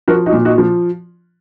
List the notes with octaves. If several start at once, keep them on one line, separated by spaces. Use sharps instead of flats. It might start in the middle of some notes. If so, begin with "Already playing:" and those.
F3 F#4 A#4
D#4 F#4
A#2
D#4 F#4
F3